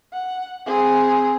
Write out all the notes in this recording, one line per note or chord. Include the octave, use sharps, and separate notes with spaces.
F#5
C4 G#4